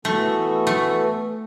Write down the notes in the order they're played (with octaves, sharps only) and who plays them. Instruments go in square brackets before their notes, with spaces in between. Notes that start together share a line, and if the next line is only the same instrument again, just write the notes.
[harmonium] E3 B3 F#4 A4 [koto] A3
[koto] A3